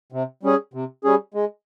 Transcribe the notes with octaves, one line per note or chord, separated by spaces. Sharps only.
C3
G3 C#4 G#4
C3
G3 C#4 G#4
G#3